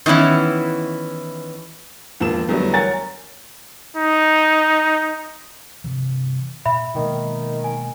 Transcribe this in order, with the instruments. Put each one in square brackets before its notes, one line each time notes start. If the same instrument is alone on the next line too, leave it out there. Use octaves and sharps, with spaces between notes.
[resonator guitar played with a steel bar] D#3 E3 B3 C#4 E4
[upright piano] E1 F3 A#3 E7
E2 D3 F#3 G3 A3
A#4 C#5 F#5 G#5 A#5 A6
[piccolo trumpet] D#4
[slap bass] G2 C3 E3
[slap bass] A#2 [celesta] E5 B5
[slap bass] B2 G#3 A#3 [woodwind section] D#3
[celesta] G#5